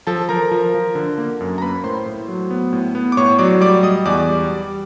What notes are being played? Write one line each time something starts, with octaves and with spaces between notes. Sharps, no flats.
F3 A4 A5
F3 A#4 A#5
F3
F3
D3
A#3
F#2
A#5
A#3 B4 B5
A2 C5 C6
A2
F#3
B3
A2
B3
D6
A2 C#5 C#6
F#3 D5 D6
G3 D5 D6
G3 D#5 D#6
E2 D5 D6
G3
G3